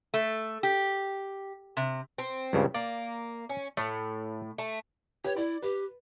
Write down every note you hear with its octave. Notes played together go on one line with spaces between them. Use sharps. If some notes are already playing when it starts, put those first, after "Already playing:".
A3
G4
C3
C4
C#2 G2 C#3
A#3 D5
C#4
A2 A3
A3 A5
G4 B4 C#5
E4 D5
G4 B4